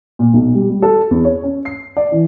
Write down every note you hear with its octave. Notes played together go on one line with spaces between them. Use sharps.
A#2
B1
G3
G3
A4
E2
C#5
C#4
C7
D5
E3